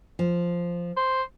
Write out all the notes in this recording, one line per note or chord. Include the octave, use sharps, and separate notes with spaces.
F3
C5